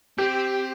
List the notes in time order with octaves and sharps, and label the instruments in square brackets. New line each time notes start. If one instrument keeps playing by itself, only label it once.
[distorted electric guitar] C4 [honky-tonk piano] G4